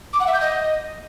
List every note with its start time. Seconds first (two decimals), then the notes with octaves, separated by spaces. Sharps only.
0.13 D6
0.20 F#5
0.27 E5
0.33 G6
0.40 D#5